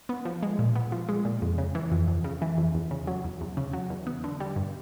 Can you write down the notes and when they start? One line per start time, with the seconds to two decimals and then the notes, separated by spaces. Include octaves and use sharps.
0.09 B3
0.25 F3
0.43 G#3
0.59 A#2
0.76 B3
0.92 F3
1.09 G#3
1.25 A#2
1.42 F2
1.58 C#3
1.75 E3
1.92 F2
2.08 F2
2.24 C#3
2.42 E3
2.58 F2
2.74 E2
2.91 C#3
3.07 F#3
3.24 E2
3.41 E2
3.57 C#3
3.73 F#3
3.90 E2
4.07 B3
4.24 D3
4.40 G3
4.56 G2